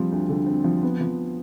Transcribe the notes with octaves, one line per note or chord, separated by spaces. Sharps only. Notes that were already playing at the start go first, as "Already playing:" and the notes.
Already playing: F3 G3 C4
D2
D3
C4
F3
B3
F3